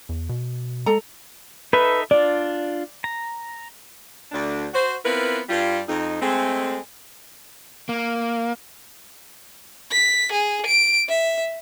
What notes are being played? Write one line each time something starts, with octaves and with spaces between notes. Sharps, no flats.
E2
B2
G#3 A4 A#5
D#4 A4 B4 E5
D4 F4 D5
A#5
D2 D4
F#4 C5
B3 C4 E4 F4 A#4 B4
G2 G3 F4
F2 D#4
G#3 A3 C4
A#3
B6
G#4
D7
E5